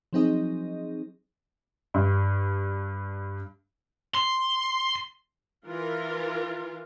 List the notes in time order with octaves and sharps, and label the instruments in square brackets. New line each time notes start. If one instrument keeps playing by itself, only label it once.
[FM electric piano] F3 F#3 C4 D#4 G#4 D#5
[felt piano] G2
[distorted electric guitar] C6
[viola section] E3 F4 A#4